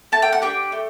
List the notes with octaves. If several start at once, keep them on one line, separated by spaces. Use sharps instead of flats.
A3 A5
G5
F#5
D4 G4 G5
A3